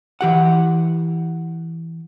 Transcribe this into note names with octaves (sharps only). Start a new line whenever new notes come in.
E3 G4 F#5